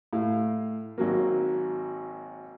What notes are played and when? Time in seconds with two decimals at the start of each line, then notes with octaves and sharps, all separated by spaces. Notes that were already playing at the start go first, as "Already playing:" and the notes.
0.13 A2 F5
0.98 G#1 F#3 A#3